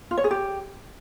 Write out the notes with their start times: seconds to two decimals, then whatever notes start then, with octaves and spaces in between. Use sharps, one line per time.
0.11 F4
0.18 C#5
0.24 G#4
0.31 G4